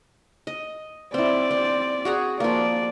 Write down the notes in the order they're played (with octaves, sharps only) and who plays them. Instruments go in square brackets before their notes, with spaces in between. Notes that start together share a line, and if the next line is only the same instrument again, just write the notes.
[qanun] D#5
[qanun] C4 E4 [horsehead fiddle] D5
[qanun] C4
F#4 G#4 A#5
[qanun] F3 A#3 [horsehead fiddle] D5